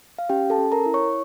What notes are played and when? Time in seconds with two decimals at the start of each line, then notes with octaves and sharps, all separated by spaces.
0.18 F5
0.29 C#4 G4 G5
0.50 A4 A5
0.58 C#4
0.72 A#4 A#5
0.86 E4
0.94 C#5 C#6